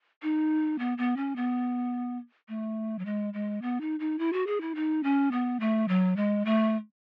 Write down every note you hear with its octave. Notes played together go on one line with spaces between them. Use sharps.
D#4
B3
B3
C#4
B3
A3
F#3
G#3
G#3
B3
D#4
D#4
E4
F#4
G#4
E4
D#4
C#4
B3
A3
F#3
G#3
A3